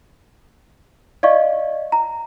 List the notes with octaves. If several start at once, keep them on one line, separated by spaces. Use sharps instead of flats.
D5 D#5 F5 C#6
A#5